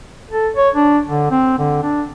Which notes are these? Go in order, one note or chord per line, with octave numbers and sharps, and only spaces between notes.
A4
C#5
D4
D3
C4
D3
D4